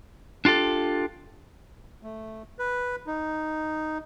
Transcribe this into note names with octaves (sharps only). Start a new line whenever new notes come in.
D4 F4 G4 A4
A3
B4
D#4